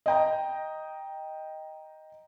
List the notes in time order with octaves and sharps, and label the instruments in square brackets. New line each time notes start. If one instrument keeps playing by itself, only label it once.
[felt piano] D#5 G5 A#5